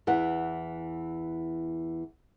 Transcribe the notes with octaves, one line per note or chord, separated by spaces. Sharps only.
E2 E3 F#5